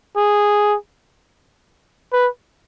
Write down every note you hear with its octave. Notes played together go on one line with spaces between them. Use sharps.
G#4
B4